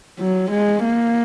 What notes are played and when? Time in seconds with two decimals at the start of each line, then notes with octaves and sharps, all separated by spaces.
0.20 F#3
0.51 G#3
0.84 A#3